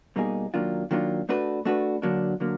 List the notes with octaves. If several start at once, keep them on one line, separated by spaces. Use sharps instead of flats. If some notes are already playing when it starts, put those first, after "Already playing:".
B2 G3 A#3 D#4 G#4
D#3 F#3 A#3 D4 F4
D#3 F#3 A#3 D4 F4
A3 D4 F#4 B4
A3 D4 F#4 B4
D3 F#3 A#3 D4
D3 F#3 A#3